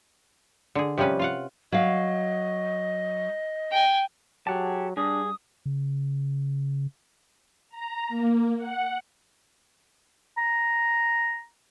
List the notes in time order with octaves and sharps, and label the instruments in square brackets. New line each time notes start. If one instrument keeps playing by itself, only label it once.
[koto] D3 G#4
C3 F3 G3 C#4 B4
F4 F5 F#5
[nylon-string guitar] F#3 F5 [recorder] D#5
[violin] G5 G#5
[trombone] F#3 [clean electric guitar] G4 [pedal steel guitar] G#4 F#5 A5
[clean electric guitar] G2 [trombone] D4 [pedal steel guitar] G#4 [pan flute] D#6
[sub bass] C#3
[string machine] A#5
A#3
F#5
[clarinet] A#5